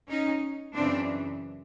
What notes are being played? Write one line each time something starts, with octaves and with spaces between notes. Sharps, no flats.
C#4 D#4
F#2 C#3 E3 C4 D4